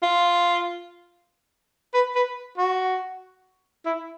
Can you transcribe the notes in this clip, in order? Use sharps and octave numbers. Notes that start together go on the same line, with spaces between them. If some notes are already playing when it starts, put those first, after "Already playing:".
F4
B4
B4
F#4
E4